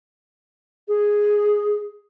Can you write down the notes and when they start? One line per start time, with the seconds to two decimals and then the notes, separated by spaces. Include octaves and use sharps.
0.88 G#4